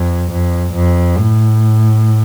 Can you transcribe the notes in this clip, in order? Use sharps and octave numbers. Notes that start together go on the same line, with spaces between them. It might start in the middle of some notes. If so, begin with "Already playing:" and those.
Already playing: F2
F2
F2
A2